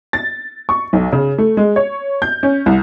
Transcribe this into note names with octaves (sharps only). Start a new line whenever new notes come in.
A6
C#6
B1
C#3
A3
G#3
C#5
G6
C#4
C2